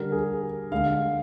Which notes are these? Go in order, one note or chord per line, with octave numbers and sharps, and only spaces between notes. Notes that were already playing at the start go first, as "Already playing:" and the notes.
Already playing: D3 G3 A#4
G#4
D3 G#3 F5